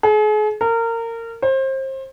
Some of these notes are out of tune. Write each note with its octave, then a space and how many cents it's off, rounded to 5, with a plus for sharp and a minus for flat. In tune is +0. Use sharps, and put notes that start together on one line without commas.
G#4 +40
A#4 -25
C5 +30